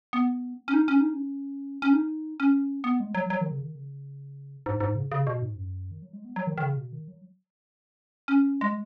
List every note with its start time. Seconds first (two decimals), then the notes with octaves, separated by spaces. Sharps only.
0.13 B3
0.68 C#4
0.74 D#4
0.88 C#4
1.01 D#4
1.13 C#4
1.82 C#4
1.93 D#4
2.40 C#4
2.84 B3
3.00 G#3
3.15 F#3
3.30 F#3
3.41 D#3
3.52 C#3
3.61 D#3
3.75 C#3
4.66 G#2
4.80 G#2
4.95 C#3
5.12 C#3
5.27 B2
5.42 G#2
5.56 F#2
5.91 D#3
6.02 F#3
6.13 G#3
6.25 B3
6.36 F#3
6.47 D#3
6.58 D#3
6.63 C#3
6.77 B2
6.93 D#3
7.08 F#3
8.28 C#4
8.61 G#3